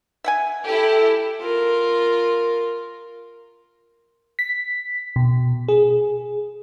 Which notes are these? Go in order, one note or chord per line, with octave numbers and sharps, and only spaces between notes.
E5 F#5 G#5
E4 G4 A4
F4 A#4
B6
B2
G#4